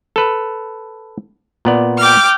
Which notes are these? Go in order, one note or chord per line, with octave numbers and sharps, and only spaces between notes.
A4 B4
A#2 B3 D5
G5 D6 F6